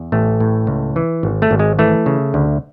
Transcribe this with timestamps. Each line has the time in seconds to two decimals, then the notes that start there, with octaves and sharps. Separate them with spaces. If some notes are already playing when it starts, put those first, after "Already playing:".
Already playing: E2
0.12 A1 A3
0.40 A2
0.67 C#2
0.96 E3
1.23 G#1
1.42 A3
1.51 G#1
1.59 G#3
1.79 E3 A3
2.06 C#3
2.34 D2